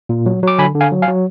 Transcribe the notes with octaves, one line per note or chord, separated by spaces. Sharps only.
A#2
F#3
F#3 D6
D3 G#5 B5
D3
F5 G#5
F#3
F5 G#5
F#3